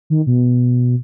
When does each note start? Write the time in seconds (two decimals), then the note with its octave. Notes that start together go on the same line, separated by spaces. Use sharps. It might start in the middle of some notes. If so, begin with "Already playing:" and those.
0.10 D#3
0.27 B2